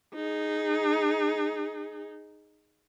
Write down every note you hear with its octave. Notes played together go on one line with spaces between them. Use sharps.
D#4 G#4